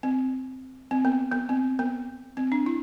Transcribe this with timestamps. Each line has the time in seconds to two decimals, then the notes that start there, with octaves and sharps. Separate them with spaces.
0.03 C4
0.91 C4
1.05 B3
1.32 B3
1.49 C4
1.79 B3
2.37 C4
2.52 D4
2.66 E4